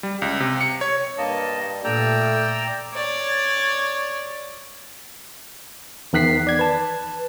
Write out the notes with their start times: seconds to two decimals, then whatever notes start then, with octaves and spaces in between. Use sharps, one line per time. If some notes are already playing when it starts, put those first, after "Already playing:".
0.03 G3
0.22 C#2
0.40 C3
0.61 C#7
0.81 C#5
1.18 G2 A#3 D#5 A5
1.84 A#2 A3 D5 G5 A#5 E6
2.93 C#5 D5
6.13 E2 D#3 F#6 B6 C7
6.47 D5 G#6
6.59 B4 A5